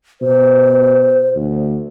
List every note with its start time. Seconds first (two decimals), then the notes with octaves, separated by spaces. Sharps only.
0.21 B2 C5
1.36 D2